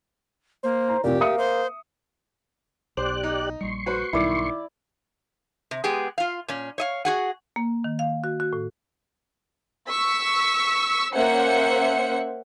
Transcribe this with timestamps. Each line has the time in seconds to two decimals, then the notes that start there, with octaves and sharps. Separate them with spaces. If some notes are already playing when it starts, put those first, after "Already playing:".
0.64 A#3 C5
0.89 A#5
1.04 F1 F2 A#2 G4
1.21 A#3 E5 D#6 C#7
1.38 C5
2.97 B1 G4 C5 D5 F#6
3.23 D#4
3.61 A#1 G3 C6 C#6
3.86 F#4 B4 C5
4.13 B1 G#2 D#3 G3 E4 D5
5.71 C3
5.84 G#3 B3 G4 G#4
6.18 F4 F5
6.48 A#2 C#4
6.78 C#5 D#5 F5
7.05 F#4 G#4 F#5
7.56 A#3
7.84 D#3
7.99 F5
8.24 F#4
8.40 F#4
8.53 A2
9.89 C#6 E6 B6
11.13 A#3 C#4 C5 E5 F#5 C#7